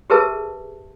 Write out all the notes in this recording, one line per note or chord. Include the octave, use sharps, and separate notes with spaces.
G4 G#4 A#4 B4 E5 A5